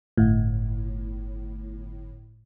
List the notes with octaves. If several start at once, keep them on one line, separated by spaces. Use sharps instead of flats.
G1 A2